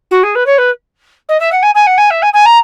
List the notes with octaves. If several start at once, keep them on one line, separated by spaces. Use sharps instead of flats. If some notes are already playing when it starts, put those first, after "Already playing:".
F#4
G#4
B4
C#5
B4
D#5
E5
F#5
G#5
G#5
F#5
G#5
E5
G#5
G#5
A#5